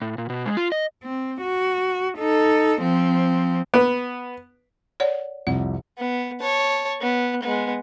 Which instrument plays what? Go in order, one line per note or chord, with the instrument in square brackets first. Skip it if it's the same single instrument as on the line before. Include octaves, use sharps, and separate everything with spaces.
[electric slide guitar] A2
A#2
B2
G#3
F4
D#5
[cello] C4
F#4
D#4 A4
F3 C4
[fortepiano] B3
[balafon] C#5 D5 F#5
[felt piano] C2 F2 [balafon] F#5
[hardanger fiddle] B3
C#5 A5
B3
G#3 B3